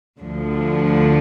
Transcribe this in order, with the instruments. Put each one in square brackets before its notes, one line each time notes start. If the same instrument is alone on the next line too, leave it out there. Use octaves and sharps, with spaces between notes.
[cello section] D2 D3 F3